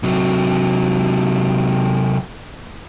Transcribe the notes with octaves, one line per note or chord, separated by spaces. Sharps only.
C3 F#3